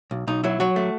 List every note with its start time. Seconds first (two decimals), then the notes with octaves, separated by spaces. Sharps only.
0.11 B1
0.27 B1 D#4
0.44 F#3 E4
0.60 F#3 F#4
0.76 A3